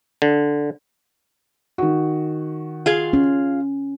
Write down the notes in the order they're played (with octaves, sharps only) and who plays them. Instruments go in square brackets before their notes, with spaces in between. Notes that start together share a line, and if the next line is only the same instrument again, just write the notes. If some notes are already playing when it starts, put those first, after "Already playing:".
[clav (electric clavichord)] D3
[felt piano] D#3 F#4
[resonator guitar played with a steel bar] F4 G#4 F5
[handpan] C#4